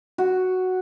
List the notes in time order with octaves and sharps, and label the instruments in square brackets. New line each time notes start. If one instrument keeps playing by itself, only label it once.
[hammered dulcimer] F#4